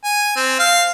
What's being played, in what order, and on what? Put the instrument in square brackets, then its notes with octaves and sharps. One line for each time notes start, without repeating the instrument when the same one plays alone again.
[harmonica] G#5
C4
F5